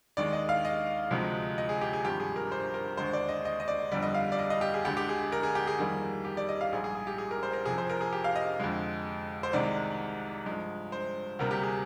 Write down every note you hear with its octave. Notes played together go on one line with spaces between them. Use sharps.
D#2 D#3 G#3 D5
D#5
F5
D#5
D2 C3 F3 G#3
D#5
G#4
G4
G#4
G#1 G2 F3 G4
G#4
A#4
C5
A#4
D#2 D3 G#3 C5
D5
D#5
D#5
D#5
D5
G1 F2 D3 G3 D5
D#5
F5
D5
D#5
D#5
G4
G#4
D2 D3 G#3 G4
G4
G#4
A#4
G#4
G4
G#4
F2 D#3 G3 A#3
G4
D5
D#5
F5
A#1 G#2 G3 G#4
G#4
G#4
G4
G#4
A#4
C5
A#4
F1 F2 C3 F3 G#4
C5
A#4
G#4
G4
F5
D#5
F2 D3 G#3
C5
C2 C3 D#3 G#3 D5
G2 F3 G#3
C5
D2 C3 G3 A#3 A#4
G4
G#4